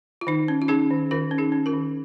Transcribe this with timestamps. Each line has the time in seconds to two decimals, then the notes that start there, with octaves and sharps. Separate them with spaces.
0.21 F4
0.27 D#3 D#4
0.48 C#4
0.62 F4
0.68 C#4 D#4 G#4
0.90 D#3
1.11 D#3 F4 A#4
1.31 C#4
1.38 D#4 G#4
1.52 C#4
1.66 F4 A#4
1.73 D#3